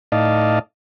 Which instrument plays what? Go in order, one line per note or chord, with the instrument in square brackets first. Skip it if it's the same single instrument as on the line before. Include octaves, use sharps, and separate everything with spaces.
[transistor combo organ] A2 D#4 D5 D#5 F5 A5